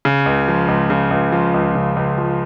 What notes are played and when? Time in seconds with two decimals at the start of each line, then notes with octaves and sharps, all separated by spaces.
0.05 C#3
0.26 C#2
0.48 F3
0.68 C#2
0.90 C#3
1.11 C#2
1.32 F3
1.54 C#2
1.75 C#3
1.96 C#2
2.18 F3